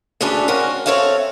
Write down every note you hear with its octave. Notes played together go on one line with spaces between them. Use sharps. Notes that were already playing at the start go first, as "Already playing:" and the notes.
D2 C#3 C#4 D4 A4 B4
C4 C#4 F#4 A#4
C4 D#4 A4 C#5 E5 F5